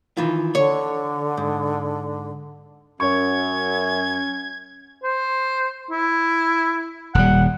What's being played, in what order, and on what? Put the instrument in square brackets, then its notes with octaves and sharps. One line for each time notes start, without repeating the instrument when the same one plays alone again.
[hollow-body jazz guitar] D#3 E3 F4
[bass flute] D3 [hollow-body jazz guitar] C#5
[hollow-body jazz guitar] G#2
[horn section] F#2 [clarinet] C#4 [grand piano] C#5 C#6 [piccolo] G#6
[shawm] C5
E4
[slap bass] D#1 G3 [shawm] F#5